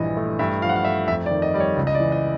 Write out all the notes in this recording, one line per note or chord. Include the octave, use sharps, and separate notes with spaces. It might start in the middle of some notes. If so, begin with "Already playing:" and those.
Already playing: A#1 G2 E3 D#5
A3
G2 E5
F3 F5
F#5
F5
A3 E5
F2 E5
D5
D#3
D#5
G3 D5
C#5
C#2
D#5
D5
E3
D#5